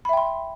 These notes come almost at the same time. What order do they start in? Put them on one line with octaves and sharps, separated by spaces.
B5 E5 G5 C6